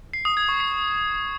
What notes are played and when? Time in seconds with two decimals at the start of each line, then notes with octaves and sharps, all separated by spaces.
0.13 C7
0.25 D#6
0.37 G#6
0.49 C#6
0.60 C7